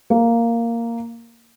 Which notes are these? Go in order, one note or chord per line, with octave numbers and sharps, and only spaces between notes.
A#3